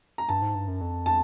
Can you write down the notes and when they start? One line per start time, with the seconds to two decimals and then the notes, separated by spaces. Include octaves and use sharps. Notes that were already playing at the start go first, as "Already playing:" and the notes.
0.18 A#5
0.29 G2 A5
0.42 G#2
0.55 G2
0.68 F#2
0.80 F2
1.06 A5